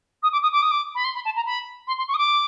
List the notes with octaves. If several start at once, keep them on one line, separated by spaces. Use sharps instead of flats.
D#6
D6
D#6
D6
D#6
D6
B5
C6
B5
A5
A#5
B5
C6
C6
C#6
D#6
D6